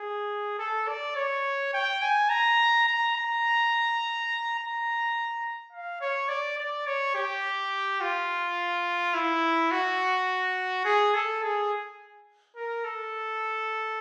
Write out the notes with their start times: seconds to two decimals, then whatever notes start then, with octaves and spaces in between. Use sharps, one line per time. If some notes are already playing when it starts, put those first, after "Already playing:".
Already playing: G#4
0.59 A4
0.88 D5
1.16 C#5
1.74 G5
2.02 G#5
2.30 A#5
2.88 A#5
3.15 A#5
4.59 A#5
5.73 F5
6.01 C#5
6.29 D5
6.57 D5
6.86 C#5
7.15 G4
8.01 F4
9.14 E4
9.71 F#4
10.85 G#4
11.15 A4
11.43 G#4
12.56 A#4
12.85 A4